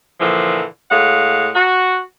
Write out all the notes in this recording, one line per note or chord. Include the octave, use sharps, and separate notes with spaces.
A#2 D3 E3 F3
A2 G#3 F5 F#5
F#4